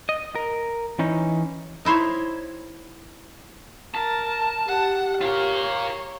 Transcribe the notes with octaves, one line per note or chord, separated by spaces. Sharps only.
D#5
A#4
E3 C#4 D#4
D#4 E4 C5 C#5
A#4 A5
G4 F#5
F4 A#4 C#5